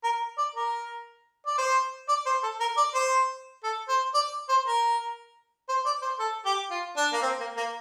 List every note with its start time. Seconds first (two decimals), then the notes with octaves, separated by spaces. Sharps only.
0.04 A#4
0.38 D5
0.55 A#4
1.47 D5
1.58 C5
2.08 D5
2.26 C5
2.43 A4
2.60 A#4
2.77 D5
2.95 C5
3.64 A4
3.88 C5
4.14 D5
4.49 C5
4.66 A#4
5.69 C5
5.86 D5
6.02 C5
6.19 A4
6.46 G4
6.71 F4
6.97 D4
7.13 A#3
7.22 C4
7.40 A#3
7.57 A#3